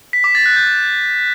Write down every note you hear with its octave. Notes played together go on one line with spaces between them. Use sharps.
B6
D6
A6
F#6
G6